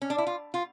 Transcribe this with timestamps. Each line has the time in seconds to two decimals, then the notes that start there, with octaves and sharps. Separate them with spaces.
0.02 C#4
0.10 D4
0.18 E4
0.27 F4
0.54 F4